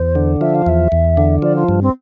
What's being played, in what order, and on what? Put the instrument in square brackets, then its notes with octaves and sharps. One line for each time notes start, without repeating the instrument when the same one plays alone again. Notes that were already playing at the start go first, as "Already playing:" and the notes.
Already playing: [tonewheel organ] E2 [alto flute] C5
[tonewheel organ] D3
[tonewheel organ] F3 [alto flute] E5
[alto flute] F5
[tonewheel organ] E2 [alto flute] E5
[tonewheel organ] E2
D3
[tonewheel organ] F3 [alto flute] D5
[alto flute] F4
[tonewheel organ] G2
[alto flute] C4